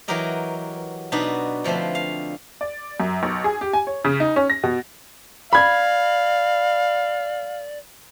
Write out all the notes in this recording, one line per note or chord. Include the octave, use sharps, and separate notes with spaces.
E3 F#3 F#4 G4 A#4 D#5
B2 D4 D#4 F#4 B4
D3 F3 A3 C4 B4
F5
D5
F#2
B1
G#4
G4
G#5
C#5
C#3
D#4
C#4
A#6
B2
D5 F5 B5 G#6